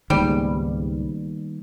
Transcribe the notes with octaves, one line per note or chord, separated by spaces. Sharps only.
C#2 G#2 D#3 G3 A#3 B3